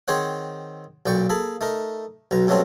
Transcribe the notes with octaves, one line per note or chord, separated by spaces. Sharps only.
D#3 C4 G#4 C5 C#5 F#5
B1 A#2 D5 G5 C#6
A#3 G#4 A4 B5
A3 D#4 A#4
B1 B2 A#5
G2 B2 F#3 A3 C4 C#4